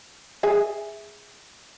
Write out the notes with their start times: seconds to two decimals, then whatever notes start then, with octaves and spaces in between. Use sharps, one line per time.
0.43 G#4 E5 G#5